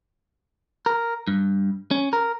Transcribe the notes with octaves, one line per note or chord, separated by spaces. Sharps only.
A#4
G2
C#4
A#4